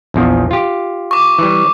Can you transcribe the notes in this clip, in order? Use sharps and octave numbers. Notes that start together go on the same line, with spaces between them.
A#1 E2 F3
F4 G4
C#6 D6
E3 G3